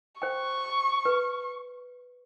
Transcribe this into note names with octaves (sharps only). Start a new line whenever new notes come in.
C5 G5 C#6
B4